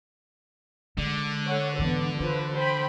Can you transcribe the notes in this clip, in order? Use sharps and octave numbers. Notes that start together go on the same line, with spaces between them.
D3 G#3
A4 C#5 F#5
G#2 E3 B3 D4
E3 F3 B4
C5 G5 B5